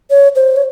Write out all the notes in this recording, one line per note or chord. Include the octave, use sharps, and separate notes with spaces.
C#5
C5
C#5